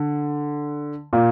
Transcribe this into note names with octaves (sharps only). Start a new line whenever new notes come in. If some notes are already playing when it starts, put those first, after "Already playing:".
Already playing: D3
A#2